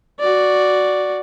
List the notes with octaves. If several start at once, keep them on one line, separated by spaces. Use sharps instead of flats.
F#4 D5